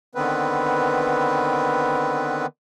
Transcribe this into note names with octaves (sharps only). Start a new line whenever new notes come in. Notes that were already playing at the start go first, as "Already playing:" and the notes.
D3 D#3 B3 C4 B4